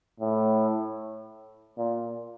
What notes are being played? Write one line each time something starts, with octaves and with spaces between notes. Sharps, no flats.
A2
A#2